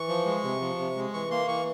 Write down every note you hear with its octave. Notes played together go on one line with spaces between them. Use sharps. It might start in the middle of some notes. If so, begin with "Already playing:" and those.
Already playing: E3 C#6
F3
G#3
C3
F3
C3
G#3
E3 C#6
A#3 C6
E3 C#6